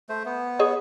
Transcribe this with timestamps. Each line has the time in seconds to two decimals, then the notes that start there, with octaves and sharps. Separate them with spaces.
0.09 A3 C5
0.25 B3
0.59 G#4 C#5 D#5